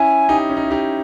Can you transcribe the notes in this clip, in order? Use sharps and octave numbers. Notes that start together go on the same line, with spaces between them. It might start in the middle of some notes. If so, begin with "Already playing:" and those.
Already playing: C#4 E4 G#5
D#4 G4
C#4
D#4
E4
D#4 G4